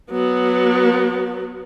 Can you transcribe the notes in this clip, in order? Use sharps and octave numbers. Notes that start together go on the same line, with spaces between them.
F#3 B3